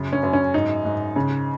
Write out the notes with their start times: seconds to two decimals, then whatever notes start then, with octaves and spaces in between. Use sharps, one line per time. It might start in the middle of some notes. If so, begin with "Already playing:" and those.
Already playing: F#2 C#3
0.13 C#4
0.23 F#2
0.33 C#4
0.54 G#2 D#4
0.85 G#2
1.16 C#3